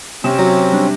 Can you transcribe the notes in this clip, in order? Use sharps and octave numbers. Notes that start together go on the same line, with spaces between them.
C3 C4 C#4 E7
F#3 F#4
G3 D4